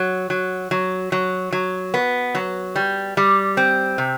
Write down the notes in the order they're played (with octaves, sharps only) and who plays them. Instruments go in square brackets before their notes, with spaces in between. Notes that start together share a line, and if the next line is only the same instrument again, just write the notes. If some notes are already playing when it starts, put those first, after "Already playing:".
Already playing: [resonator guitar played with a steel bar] F#3
F#3
F#3
F#3
F#3
B3
F#3
G3
G3
C4
C3